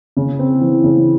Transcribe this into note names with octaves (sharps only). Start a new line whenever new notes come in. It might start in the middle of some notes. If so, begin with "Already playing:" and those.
C#3
C4
E3
C#3